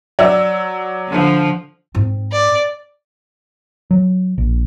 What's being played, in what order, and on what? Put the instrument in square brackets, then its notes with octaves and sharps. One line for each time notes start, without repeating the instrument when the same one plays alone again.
[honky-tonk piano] F#3 E6 [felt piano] D5
[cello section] D3 F3
[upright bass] G#2 C4
[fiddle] D5
[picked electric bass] F#3
A#1